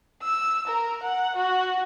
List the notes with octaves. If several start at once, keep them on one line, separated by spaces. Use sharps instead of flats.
E6
A#4
F#5
F#4